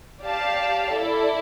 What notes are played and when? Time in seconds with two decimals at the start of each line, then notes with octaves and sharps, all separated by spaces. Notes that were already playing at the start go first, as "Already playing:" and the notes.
0.22 G4 D5 F5 A5
0.91 E4 A4 D5